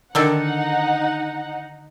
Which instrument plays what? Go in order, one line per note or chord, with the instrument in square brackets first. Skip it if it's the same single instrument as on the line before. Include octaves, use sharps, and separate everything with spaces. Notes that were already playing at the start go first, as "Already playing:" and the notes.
[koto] D3 D#3 A4 [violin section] D#4 F#5